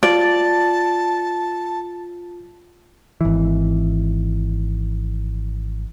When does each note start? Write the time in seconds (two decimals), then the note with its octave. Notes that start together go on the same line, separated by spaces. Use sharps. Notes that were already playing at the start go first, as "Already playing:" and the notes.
0.03 F4 D5 A5
3.21 G#1 E3